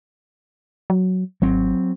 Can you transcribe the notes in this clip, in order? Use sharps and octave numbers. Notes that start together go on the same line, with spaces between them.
F#3
G#1 F#3 C4